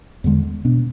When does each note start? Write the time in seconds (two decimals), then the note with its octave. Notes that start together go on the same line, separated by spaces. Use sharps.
0.24 E2 D3 G#3
0.65 B2 B3 D4